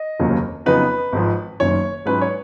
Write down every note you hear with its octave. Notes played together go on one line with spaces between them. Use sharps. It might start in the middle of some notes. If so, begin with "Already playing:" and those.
Already playing: D#5
F1 D#2 C#3 F#3 A#3
F2 C#3 F#3 B3 D#4 B4
G#1 G#2 F3
F#1 F#2 D#3 C#5
G#2 F#3 C#4 B4
C#5